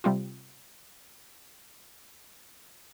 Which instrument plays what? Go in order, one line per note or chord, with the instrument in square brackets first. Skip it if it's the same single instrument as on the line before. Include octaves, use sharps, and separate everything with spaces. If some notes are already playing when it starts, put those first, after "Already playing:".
[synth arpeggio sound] C3 G3 C4 F4